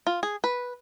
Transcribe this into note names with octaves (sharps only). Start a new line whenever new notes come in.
F4
G#4
B4